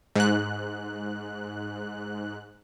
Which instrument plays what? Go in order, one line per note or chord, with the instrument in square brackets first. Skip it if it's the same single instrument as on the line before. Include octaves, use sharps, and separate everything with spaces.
[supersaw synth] G#2 F#6